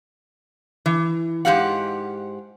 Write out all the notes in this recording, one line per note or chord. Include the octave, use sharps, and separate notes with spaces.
E3
G#2 E3 G4 F5 F#5